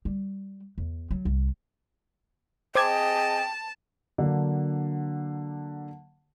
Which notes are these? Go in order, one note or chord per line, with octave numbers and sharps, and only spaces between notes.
G3
E2
F#3
C2
C4 G#4 C5 D#5 G5 A5 D6 G#6
D3 F#3 A#3 D4